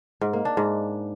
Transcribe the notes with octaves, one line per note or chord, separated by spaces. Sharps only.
G#2
A#3
D4
G#2